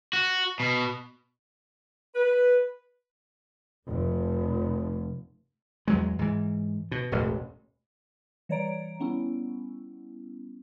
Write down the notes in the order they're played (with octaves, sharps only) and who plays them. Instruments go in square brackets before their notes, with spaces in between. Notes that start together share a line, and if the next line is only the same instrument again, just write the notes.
[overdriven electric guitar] F#4
B2
[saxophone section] B4
[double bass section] F1
[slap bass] E2 F#3 G#3
G#2 E3
B2
E1 A1 E2
[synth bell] E3 G3 C#5 D5 A#5 D7
G3 B3 C#4 E4